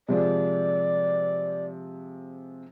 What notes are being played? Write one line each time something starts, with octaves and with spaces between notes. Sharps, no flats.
C3 F3 G#3 D5